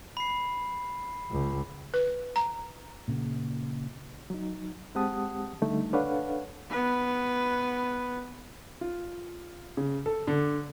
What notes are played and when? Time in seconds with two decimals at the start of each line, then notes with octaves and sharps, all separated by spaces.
0.17 B5 C7
1.31 C#2
1.94 B4
2.36 A#5
3.08 A#2 C#3
4.30 F#3 D#4
4.95 G#3 C4 G4 F#5 A5 D#6
5.62 D3 G3 A3 D#4
5.93 D4 A4 B4 C#5 F5 F#5
6.70 B3 B4
8.81 F4
9.77 C#3
10.06 A4
10.27 D3